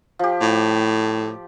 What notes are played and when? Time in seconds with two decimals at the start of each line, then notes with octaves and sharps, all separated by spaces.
0.19 F3 G4
0.41 A2